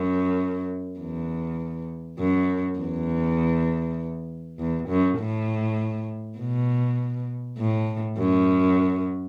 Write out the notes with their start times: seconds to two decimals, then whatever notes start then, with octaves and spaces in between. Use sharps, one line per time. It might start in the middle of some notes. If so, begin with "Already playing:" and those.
Already playing: F#2
0.99 E2
2.19 F#2
2.79 E2
4.59 E2
4.89 F#2
5.19 A2
6.39 B2
7.58 A2
8.18 F#2